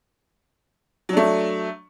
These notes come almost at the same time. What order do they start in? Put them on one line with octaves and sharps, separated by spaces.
F#3 D4 A3